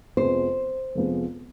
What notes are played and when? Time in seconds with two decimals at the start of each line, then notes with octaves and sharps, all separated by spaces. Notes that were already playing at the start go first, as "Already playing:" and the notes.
0.17 F2 C3 F3 G#3 B3 C5
0.95 F2 C3 F3 G#3 B3